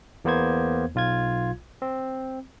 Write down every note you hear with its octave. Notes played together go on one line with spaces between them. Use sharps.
E2 A#3 B3 C5 G#6
B1 F4 G#6
C4